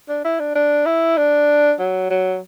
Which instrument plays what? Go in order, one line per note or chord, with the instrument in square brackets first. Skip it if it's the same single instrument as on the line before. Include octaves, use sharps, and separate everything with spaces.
[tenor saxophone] D4
E4
D4
D4
E4
D4
F#3
F#3